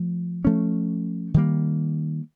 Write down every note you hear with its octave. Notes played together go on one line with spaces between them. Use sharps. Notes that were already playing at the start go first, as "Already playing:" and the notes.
Already playing: F3 A3
F3 A3 C#4
D#3 G3 A#3